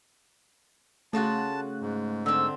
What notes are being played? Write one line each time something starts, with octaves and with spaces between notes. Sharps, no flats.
C#3 A3 F4 F#4 A5 F#6
G#2
D3 C4 E6